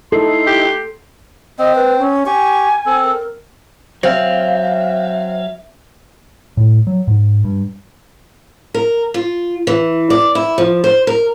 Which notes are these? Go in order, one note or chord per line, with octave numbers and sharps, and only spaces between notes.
D#4 E4 A4 C6
G4
C4 D#5
B4
C#4
G4 G#5 C#6
C4 A4
A#4
F#3 C4 E5 F5
A2
F#3
G#2
G2
A#4
F4
E3
D5
E4
F3
C5
A#4